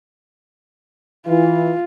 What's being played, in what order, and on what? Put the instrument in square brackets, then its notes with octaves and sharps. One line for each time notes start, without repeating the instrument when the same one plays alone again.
[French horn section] E3 [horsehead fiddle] F4